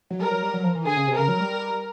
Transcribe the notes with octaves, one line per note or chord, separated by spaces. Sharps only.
F#3
G3 A#4
F#3
G3
F#3
F3
E3
D3 G#4
C#3
C3
C#3 A#4
F#3
G3